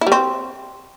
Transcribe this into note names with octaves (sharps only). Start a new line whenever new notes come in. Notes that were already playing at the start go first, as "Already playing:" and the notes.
E4
G3
C4